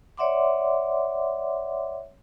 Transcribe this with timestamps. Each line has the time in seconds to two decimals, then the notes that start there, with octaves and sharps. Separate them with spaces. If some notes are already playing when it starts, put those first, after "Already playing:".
0.17 C#5 D5 E5 F#5 C6 D6